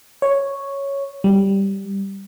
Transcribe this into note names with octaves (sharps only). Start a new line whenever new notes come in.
C#5
G3